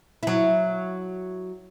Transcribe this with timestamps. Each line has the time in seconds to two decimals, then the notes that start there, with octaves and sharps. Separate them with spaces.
0.23 F#3 E4